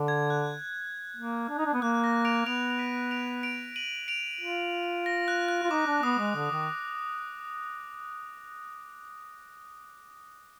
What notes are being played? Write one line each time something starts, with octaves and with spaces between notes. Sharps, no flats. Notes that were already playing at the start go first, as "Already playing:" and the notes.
Already playing: D3
G#6
F#6
A#3
D4
D#4
D4
B3
A#3 F#6
A#6
D7 F7
B3 D7 F7
F7
B6 D#7
D7 F7
D7 F7
D#7 F#7
D7 F7
F4
A#6
F#6
F#6
F4
D#4 D6
D4
B3 D#6
G#3
D3
D#3